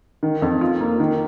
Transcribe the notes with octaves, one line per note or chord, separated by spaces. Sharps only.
D#3
F2
F4
A#3
D#3